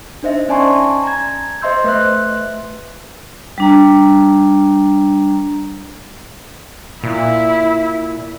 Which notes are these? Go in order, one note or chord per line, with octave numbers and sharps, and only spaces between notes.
D4 D#4 C5 D#5 E5
C#4 D5 G#5 A5 C6 C#6
A#5 G#6
C5 D#5 E5 C6 E6 G6
A3 B4 E5 C6 F#6
G3 D4 A#5
A#2 E4